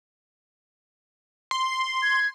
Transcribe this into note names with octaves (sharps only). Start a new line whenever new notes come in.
C6
G#6